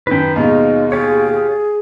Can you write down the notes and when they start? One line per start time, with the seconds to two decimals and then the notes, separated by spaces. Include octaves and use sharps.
0.07 F#2 D#3 B4 G5
0.36 D#2 B2 G#3 D#4 F4
0.92 F4 G4 G#4 C#5
1.33 G#4